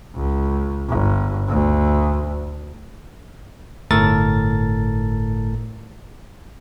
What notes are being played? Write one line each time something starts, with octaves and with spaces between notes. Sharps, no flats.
C#2
G1
D2
G1 A2 A4 A#4 A6